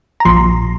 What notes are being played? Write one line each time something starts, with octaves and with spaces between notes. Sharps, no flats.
A#5
A#1 A#2 F3 C6